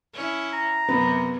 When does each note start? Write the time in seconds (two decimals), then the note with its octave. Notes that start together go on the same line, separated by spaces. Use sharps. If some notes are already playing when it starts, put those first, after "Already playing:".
0.13 C#4 E4
0.53 A#5
0.89 F#2 C3 B3